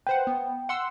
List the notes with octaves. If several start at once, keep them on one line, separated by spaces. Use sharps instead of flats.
B4 C5 F#5 G5
B3
F#5 C6 E6